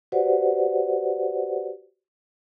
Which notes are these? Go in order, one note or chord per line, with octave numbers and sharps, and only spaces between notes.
F#4 G4 B4 C5 D5 F#5